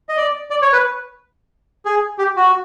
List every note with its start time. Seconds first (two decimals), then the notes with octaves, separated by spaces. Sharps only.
0.09 D#5
0.17 D5
0.50 D5
0.62 C#5
0.73 B4
1.85 G#4
2.18 G4
2.36 F#4